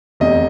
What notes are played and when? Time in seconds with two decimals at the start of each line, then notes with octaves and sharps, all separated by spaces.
0.20 F1 E2 C3 D#5